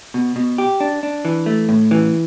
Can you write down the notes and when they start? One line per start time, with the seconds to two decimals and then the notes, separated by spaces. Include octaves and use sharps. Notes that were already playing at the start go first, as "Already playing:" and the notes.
0.14 B2
0.36 B2
0.58 G4
0.80 D4
1.03 D4
1.25 E3
1.46 A3
1.69 A2
1.91 E3